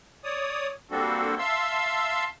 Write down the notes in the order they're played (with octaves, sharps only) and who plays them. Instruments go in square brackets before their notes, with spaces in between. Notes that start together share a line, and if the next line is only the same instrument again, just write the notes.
[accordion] C#5 D5 D#6
G3 A#3 C4 D4 F#4 A4
E5 F5 A5 C6 E6